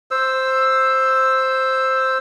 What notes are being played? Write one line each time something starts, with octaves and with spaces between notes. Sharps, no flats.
C5 E6